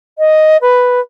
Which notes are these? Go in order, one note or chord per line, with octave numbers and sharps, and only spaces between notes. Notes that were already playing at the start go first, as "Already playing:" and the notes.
D#5
B4